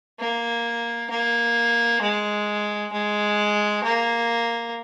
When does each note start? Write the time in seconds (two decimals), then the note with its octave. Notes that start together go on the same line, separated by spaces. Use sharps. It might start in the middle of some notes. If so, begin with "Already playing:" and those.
0.20 A#3
1.11 A#3
2.02 G#3
2.92 G#3
3.84 A#3